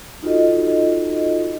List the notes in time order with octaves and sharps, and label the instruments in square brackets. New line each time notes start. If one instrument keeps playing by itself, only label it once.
[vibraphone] D#4 F4 F#4 A4 D#5